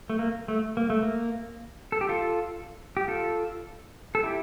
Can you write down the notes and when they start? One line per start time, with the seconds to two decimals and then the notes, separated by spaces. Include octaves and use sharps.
0.10 A3
0.19 A#3
0.48 A3
0.77 A#3
0.90 A3
1.03 A#3
1.92 A4
2.01 G4
2.09 F4 A4
2.97 G4
3.08 F4 A4
4.15 A4
4.23 E4 G4